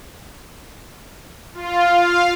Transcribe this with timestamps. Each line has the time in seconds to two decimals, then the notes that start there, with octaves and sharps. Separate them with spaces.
1.54 F4
1.93 F5